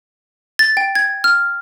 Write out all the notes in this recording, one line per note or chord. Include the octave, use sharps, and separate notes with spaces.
A6
G5
G#6
F6